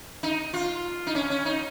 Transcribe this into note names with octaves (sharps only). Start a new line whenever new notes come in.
D#4
F4
D#4
C#4
C#4
D#4